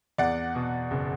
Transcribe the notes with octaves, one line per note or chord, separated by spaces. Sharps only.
E2 D5 F#5
B2
F#1